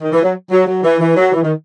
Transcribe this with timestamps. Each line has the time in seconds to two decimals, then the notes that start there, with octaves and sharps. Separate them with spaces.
0.01 D#3
0.13 E3
0.23 F#3
0.51 F#3
0.67 F#3
0.83 E3
1.00 E3
1.17 F#3
1.33 E3
1.43 D#3